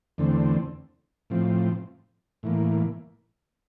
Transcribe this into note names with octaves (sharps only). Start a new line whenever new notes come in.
E2 D3 A3 C4
A2 F3 C4
A2 E3 A#3